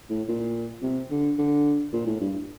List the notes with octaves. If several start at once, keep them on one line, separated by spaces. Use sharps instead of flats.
A2
A#2
C3
D3
D3
A#2
A2
G2